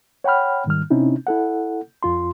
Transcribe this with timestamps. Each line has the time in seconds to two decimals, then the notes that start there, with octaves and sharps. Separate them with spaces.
0.24 C#5 F#5 G5 B5 F6
0.66 G#2 D#3 G3 F6
0.90 C3 C4 C#4 D#4 E4
1.27 E4 A4 F#5
2.03 F2 F4 C6